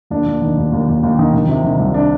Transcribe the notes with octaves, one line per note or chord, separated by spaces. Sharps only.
D#2 D4
D#2
D#3
D#2
D#2
D#2
D#2
D#3
D#3
C3
D#3
C2
D4